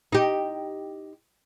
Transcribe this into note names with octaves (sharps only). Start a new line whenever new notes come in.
D#4 G4